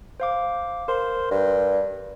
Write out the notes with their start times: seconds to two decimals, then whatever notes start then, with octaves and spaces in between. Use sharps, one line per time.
0.20 C5 F5 D6
0.88 A#4 C5
1.31 G2